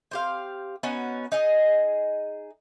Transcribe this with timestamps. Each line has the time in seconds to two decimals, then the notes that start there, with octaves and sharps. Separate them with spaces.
0.11 C4 G4 F5
0.83 B3 C#4 D#4 F#4
1.32 D#4 G#4 D#5